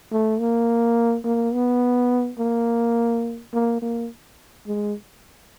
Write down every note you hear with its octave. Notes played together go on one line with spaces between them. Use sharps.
A3
A#3
A#3
B3
A#3
A#3
A#3
G#3